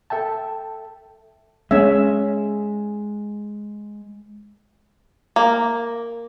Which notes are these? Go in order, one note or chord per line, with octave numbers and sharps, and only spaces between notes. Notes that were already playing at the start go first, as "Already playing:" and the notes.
A4 E5 G5 A5
G#3 C#4 E5
A#3